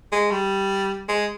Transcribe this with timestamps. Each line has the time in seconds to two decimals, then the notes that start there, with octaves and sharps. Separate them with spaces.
0.12 G#3
0.31 G3
1.08 G#3